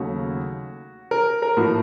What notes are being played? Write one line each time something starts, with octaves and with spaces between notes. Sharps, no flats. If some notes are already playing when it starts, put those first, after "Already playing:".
Already playing: D#2 C#3 F#3 A3 F#4
A#4
A#4
A2 F3 A#3 F#4